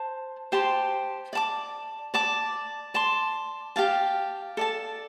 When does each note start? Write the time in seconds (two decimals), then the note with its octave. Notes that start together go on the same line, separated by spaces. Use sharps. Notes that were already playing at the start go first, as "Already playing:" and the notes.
Already playing: C5 A5
0.52 G4 C5 A5 C6
1.33 D5 A5 D6
2.14 D5 A5 D6
2.94 D5 A5 C6
3.76 G4 F5 A5
4.57 A4 D5 A5